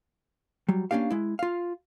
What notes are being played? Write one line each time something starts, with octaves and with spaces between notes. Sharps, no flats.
F#3 G3
A#3 C#4 D4 G4 F5
G#3 E4
F4 F5